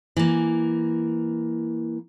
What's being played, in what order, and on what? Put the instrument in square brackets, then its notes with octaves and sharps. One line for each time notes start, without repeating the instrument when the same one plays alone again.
[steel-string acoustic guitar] E3 A#3